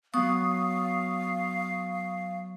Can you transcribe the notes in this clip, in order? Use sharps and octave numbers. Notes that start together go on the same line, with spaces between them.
F#3 B3 F5 C#6 D#6